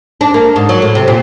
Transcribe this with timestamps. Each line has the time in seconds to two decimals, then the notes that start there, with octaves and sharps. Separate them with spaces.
0.21 D4
0.34 A#3
0.56 G#2
0.69 F#3
0.82 A2
0.95 C3
1.08 A#2